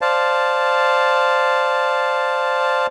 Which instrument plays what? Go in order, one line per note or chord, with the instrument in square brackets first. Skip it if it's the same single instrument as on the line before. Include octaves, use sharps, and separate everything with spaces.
[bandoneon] C5 D5 F5 A5